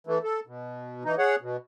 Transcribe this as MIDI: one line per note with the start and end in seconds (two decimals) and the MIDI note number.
0.07 0.19 52
0.07 0.19 57
0.24 0.40 69
0.47 1.04 47
1.05 1.15 52
1.05 1.15 63
1.18 1.36 68
1.18 1.36 73
1.18 1.36 78
1.41 1.57 47